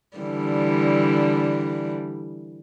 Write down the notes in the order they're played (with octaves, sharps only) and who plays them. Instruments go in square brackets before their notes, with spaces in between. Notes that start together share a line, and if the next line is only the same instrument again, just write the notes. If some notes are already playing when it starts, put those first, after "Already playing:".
[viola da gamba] D3 E3 G3